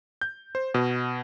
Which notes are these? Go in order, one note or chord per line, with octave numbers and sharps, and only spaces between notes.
G6
C5
B2